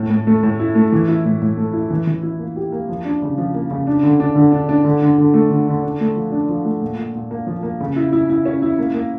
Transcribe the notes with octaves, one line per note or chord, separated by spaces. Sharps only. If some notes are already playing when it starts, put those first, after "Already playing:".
Already playing: A2
A2
A3
A2
E4
A3
E3
E4
A2
A2
A3
E4
E3
E3
E4
A#3
G4
A#3
F3
D4
C#3
F3
A#3
C#3
D4
D3
D4
D3
D4
D4
D3
D3
D3
A3
D3
D3
D4
A3
F3
D4
F3
A3
A#2
A#2
A#2
A#3
F3
A#3
C#3
E4
E4
E4
C#4
E4
A#3
A#3